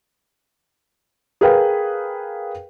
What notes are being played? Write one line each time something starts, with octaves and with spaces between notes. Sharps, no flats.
G#4 A#4 B4 F5 G5